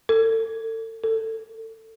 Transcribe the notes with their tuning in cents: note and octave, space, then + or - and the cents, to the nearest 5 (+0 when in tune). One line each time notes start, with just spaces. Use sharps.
A4 +35
A4 +25